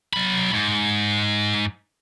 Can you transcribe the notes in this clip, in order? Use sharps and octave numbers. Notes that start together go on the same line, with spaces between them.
F#3 B5
G#2